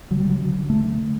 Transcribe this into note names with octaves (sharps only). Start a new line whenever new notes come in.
C#3 F#3
G3
C#3 F#3
D3
D3
D3 A3
D3
D3